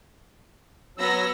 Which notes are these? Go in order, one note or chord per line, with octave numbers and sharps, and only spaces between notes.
F#3 B3 E6 A#6